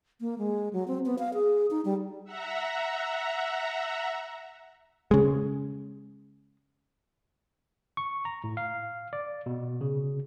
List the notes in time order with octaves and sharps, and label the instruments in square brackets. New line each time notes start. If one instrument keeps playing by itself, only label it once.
[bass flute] A#3
G#3
F#3
C4
B3
F5
G#4
D#4
G3
[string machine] E5 F#5 A#5
[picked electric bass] C#3 G#3
[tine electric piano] C#6
A#5
A2
F5
D5
B2
C#3